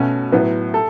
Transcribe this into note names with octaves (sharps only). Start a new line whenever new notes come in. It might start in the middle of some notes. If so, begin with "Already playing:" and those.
Already playing: B2 A3 C#4 F#4
A2 F#3 B3 F#4
A4